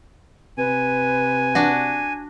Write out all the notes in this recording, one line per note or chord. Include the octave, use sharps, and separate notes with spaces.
C3 B4 G#5
D4 F#4